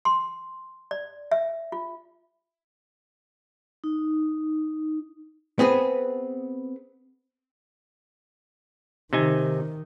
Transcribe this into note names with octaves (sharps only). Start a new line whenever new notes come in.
C6
D5
E5
F4
D#4
B3 C4 G#4 B4
C3 D#3 D#4 G#5